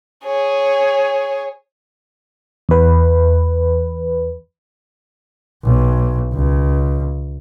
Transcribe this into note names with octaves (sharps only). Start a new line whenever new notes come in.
G#4 C#5
E2 B4
B1
C#2